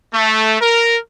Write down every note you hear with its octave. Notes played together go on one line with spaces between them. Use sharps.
A3
A#4